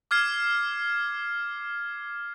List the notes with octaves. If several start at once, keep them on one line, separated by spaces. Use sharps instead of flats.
D6 F6 G#6 C7